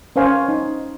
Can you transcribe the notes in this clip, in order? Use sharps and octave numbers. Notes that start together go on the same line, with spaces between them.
C#4 A#4 C5 C#5 F5 G#5
D#4